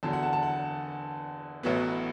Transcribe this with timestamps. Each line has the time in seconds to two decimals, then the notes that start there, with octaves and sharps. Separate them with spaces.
0.03 E2 D3 F#3 A5
0.13 F#5
0.23 A5
0.33 A5
0.43 F#5
1.63 A1 A2 F#3 B3